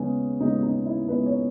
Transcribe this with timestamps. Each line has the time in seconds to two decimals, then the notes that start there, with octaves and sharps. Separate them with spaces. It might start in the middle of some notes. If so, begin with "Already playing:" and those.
Already playing: D#2 C#3 G#3 B3 G#4
0.40 D#2 C#3 G#3 B3 D#4
0.63 D#4
0.86 E4
1.08 D#2 C#3 G#3 B3 B4
1.26 C#5